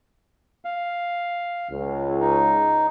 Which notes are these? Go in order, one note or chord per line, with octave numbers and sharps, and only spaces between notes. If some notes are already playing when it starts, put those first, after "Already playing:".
F5
C#2
D#4